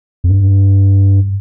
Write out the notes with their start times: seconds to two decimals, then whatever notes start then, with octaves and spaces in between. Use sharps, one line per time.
0.24 F2
0.30 G2